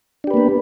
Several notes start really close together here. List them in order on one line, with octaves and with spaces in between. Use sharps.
D4 G4 B4 A#3 B3